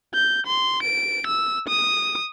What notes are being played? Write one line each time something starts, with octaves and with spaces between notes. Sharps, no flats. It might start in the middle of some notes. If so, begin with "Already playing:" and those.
G6
C6
D7
E6
D#6